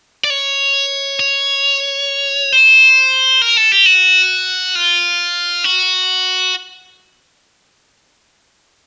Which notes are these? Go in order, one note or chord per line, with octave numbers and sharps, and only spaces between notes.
D5
C#5
C#5
C5
A#4
A4
G4
F#4
F4
F#4